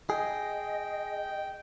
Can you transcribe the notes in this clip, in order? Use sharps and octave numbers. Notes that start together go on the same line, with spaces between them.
G#4 D#5 G5